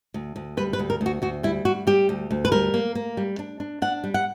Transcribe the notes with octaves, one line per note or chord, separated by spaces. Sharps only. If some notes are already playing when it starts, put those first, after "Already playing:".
D2
D2
G3 B4
B4
D2
A#4
D2
F#4
D2 F#4
G3 E4
G3 F#4
G3 G4
D2
D2
B4
G3 A#4
A#3
A#3
G3
D4
D4
D4 F#5
G3
F#5